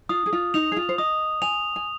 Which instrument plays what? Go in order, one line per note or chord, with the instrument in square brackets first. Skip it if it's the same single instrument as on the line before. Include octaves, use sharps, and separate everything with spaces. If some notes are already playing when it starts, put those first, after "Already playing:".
[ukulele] F4 [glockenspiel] D#6
[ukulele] G#4
F4
[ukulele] D#4 [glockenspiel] F7
[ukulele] G#4
F4
C5
[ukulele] D#5 [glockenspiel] D#6
[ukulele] G#5 [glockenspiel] F7
[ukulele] G#5